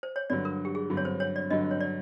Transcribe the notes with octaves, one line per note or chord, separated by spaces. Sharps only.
C5
C#5
G2 D3 F#3 D5
A#4
G4
G#4
G2 D3 F#3
C#5
C5
C#5
D5
G2 D3 F#3 D#5
C#5
D5